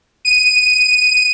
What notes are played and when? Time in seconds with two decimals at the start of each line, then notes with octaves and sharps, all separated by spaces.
0.25 D#7